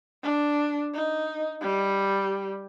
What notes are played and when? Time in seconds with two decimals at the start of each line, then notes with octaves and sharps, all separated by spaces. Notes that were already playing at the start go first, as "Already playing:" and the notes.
0.23 D4
0.94 D#4
1.61 G3